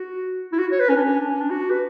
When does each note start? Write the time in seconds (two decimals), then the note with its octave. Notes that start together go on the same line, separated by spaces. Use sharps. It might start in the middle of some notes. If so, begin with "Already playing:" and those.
Already playing: F#4
0.52 E4
0.59 F#4
0.72 C#5
0.80 B4
0.89 C#4
0.96 D4
1.05 C#4
1.20 D4
1.30 C#4
1.40 D4
1.50 F#4
1.70 B4